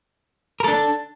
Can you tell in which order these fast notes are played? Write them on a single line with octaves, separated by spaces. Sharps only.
A#4 A4 D4